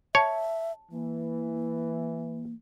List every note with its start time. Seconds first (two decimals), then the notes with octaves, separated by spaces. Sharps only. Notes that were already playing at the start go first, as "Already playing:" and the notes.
0.15 C#5 E5 A5
0.92 E3 A#3